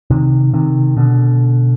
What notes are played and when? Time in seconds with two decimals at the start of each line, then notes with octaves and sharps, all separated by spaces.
0.10 C3 D#3
0.54 C3 D#3
0.97 B2 D3